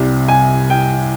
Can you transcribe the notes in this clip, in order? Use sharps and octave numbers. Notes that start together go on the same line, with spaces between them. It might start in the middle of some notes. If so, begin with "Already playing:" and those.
Already playing: C2 C3 G3
G#5
G5